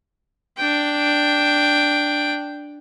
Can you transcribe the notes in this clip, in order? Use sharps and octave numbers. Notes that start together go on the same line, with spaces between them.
D4 G5